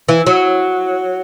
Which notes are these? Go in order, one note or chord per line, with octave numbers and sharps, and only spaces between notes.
E3
F#3